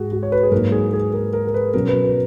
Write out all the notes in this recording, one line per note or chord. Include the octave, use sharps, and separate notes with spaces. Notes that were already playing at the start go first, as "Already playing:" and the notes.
Already playing: G#2 F#4 G#4
F#4
C#5
B4
G#4
G#2 F#3 A#3 D#4 A#4
G#4
G#4
A#4
A#4
A#4
B4
B2 F#3 C#4 A#4
B4
B4